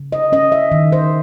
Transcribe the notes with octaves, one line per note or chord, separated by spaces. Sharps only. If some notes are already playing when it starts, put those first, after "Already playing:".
Already playing: C#3
D#5
C#4 D#5
E5
D#3
C5